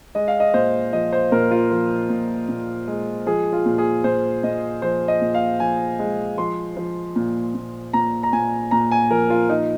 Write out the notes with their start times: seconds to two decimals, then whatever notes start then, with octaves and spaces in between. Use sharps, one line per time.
0.15 G#3 D#5
0.28 F5
0.40 D#5
0.54 A#2 C5
0.93 F3 D#5
1.12 C5
1.32 A#2 A#4
1.51 F4
1.71 F3
2.10 A#2
2.49 A#2
2.87 G#3
3.26 F3 G#4
3.53 F4
3.66 A#2
3.78 G#4
4.04 A#2 C5
4.43 A#2 D#5
4.82 F3 C5
5.08 D#5
5.21 A#2
5.34 F5
5.60 F3 G#5
5.99 G#3
6.38 F3 C6
6.77 F3
7.16 A#2
7.55 A#2
7.93 A#2 A#5
8.23 A#5
8.33 A#2 G#5
8.71 A#2 A#5
8.92 G#5
9.11 F3 A#4
9.30 F4
9.49 F3 D#4